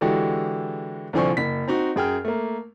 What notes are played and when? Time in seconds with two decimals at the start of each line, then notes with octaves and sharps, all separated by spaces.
0.01 D3 E3 G#3 F#4 G4 A4
1.13 C2 D3 F3 C4 G#5 C#6
1.37 F#1 B6
1.67 C4 D#4 F#4
1.96 F#2 G#4 G5 F6
2.25 A3 A#3